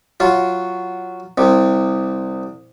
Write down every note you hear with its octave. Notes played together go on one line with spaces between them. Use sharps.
F#3 F4
C2 C3